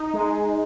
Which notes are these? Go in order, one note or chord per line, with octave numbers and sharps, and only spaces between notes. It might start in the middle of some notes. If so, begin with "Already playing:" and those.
Already playing: D#4
G#3